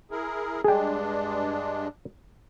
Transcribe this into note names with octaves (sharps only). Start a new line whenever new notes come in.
E4 G#4 A#4
G2 G#3 D4 G#4 G5